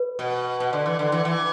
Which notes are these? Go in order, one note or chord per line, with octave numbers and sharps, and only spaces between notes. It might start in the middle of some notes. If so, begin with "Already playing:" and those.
Already playing: B4
B2
B2
D3
E3
D3
E3
E3